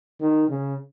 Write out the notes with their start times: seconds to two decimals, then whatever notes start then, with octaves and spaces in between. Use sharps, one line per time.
0.20 D#3
0.49 C#3